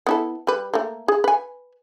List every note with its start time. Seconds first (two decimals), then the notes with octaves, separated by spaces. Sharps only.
0.07 B3 E4 A4
0.47 G3 B4
0.74 A3 A#3
1.08 G#4
1.24 B4 G#5